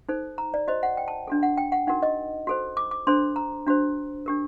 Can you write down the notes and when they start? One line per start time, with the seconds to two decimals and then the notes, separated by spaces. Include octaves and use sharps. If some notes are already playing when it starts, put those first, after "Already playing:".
0.09 D#4 A4 C5
0.38 A#5
0.54 D5
0.68 F#4 C5 D#5
0.83 F#5
0.97 G5
1.08 A5
1.28 D4 F#4 A4
1.43 F#5
1.58 G5
1.72 F#5
1.87 D#4 F#4 A#4 F#5
2.03 D#5
2.47 F#4 A4 C5
2.77 D6
2.91 D6
3.07 D4 A4 C5 C6
3.36 A#5
3.67 D4 F#4 C5
4.26 D4 G4 A#4